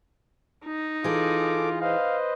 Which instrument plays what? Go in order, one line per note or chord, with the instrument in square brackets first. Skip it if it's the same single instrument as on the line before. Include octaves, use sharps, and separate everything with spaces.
[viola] D#4
[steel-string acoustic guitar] E3 G#4 [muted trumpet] F4 [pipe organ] A4 D6
[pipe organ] B4 C5 D#5 [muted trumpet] F5